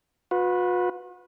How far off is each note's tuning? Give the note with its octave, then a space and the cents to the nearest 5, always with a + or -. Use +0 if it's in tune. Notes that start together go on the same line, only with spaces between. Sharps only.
F#4 -45 B4 +0